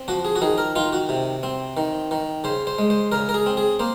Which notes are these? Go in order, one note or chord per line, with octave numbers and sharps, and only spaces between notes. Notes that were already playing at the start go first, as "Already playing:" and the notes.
Already playing: C4
F3 F#4
G#4
F#4
D#3 G#4
A#4
D#3 F4
F#4
C3
C4
D#3
D#3
C#3 C5
C5
G#3
C5
C#3 A#4
A#4
G#4
C4
G#4
A#3 C5